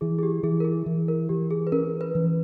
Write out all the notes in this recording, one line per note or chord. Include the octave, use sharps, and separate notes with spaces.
E3 G#4
G#4
G4
E3 G#4
A#4
G#4
E3
A#4
E3 G4
G#4
B4
C#4 A#4
B4
E3